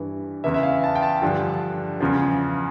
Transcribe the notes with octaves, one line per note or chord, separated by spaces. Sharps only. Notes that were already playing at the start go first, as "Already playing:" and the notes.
Already playing: G2 E3
E2 C#3 E3 E5
E5
F5
A5
G5
A5
G2 D3 F3
E2 C#3 F3